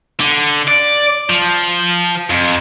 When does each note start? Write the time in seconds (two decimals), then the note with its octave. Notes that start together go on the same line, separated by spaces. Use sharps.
0.20 D3
0.68 D5
1.30 F3
2.30 F2